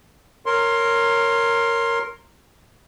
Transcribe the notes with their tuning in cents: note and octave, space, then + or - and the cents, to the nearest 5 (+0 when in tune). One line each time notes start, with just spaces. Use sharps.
A#4 -10 C#5 +0 C6 +15